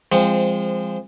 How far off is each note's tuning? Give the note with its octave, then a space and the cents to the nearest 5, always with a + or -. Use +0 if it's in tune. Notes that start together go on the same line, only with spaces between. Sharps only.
F3 -15 G#3 -25 C4 -5